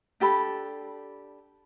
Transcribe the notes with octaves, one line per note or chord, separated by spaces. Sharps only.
D4 G4 A4 B5